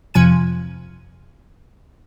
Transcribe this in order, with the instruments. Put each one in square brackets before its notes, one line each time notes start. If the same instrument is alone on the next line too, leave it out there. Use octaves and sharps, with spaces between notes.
[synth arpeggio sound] F2 C3 F3 G#5 G#6 D#7